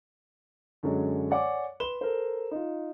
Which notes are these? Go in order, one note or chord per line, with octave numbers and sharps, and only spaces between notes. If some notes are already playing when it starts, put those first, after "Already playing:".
F#2 D3 F#3 G#3
C#5 D5 F#5 G#5 D6
B4 C6 E7 G7
A4 A#4 C5
D#4 F4